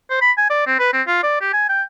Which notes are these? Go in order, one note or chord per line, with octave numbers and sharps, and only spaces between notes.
C5
B5
G#5
D5
C4
B4
C4
F4
D5
G4
G#5
G5